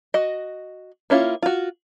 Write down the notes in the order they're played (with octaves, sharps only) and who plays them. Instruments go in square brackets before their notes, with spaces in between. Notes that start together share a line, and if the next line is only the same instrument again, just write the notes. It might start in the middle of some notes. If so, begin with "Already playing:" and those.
[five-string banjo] F#4 D#5
A#3 C#4 E4 F4
F4 F#4